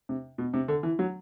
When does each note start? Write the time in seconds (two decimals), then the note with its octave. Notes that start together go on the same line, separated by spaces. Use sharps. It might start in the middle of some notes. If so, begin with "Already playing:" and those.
0.09 C3
0.38 B2
0.54 C3
0.68 D3
0.83 E3
0.99 F#3